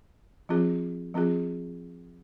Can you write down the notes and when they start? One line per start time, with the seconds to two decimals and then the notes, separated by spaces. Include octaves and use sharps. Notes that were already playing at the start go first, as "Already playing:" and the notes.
0.49 F3 C4 F4 G#4
1.14 F3 C4 F4 G#4